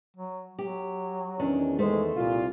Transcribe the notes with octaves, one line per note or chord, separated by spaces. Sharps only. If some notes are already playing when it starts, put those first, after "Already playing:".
F#3
F#3 G4
E2 D#3 C#4 D4
G#3 A3 C5
C2 A#2 F4